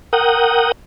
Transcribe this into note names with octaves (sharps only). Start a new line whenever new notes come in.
A#4 F#5 G5 D#6